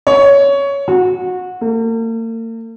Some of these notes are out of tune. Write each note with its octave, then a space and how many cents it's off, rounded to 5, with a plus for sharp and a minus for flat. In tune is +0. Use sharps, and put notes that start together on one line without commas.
C#5 +15
F#4 -20
A#3 -45